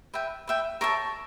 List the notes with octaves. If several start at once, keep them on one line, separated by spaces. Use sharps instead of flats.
B4 E5 G5
B4 E5 G5
A#4 C#5 E5 A5